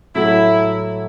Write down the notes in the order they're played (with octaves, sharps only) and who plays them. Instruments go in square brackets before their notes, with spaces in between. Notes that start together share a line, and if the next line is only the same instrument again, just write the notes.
[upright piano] A2 F#3 A3 [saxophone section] E4